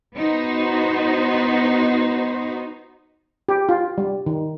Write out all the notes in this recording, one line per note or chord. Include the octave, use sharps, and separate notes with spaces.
B3 D#4 F#4 C5
G4
F4
G3
D#3